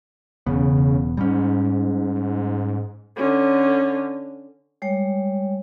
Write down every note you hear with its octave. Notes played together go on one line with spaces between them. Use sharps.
E1 E2 C#3 B3
G#2 G3 C#4
D3 C#4
G3 G#3 C#5 G5